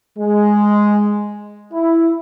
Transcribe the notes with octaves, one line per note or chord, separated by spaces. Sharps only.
G#3
E4